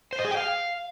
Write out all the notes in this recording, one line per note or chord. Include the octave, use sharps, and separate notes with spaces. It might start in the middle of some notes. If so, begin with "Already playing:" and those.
C5
D#5
G#4
G5
F5